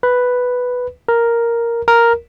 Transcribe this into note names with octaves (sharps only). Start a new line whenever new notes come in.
B4
A#4
A#4